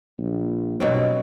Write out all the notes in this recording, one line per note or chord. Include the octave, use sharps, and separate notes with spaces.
A#1
G2 B2 F#3 C4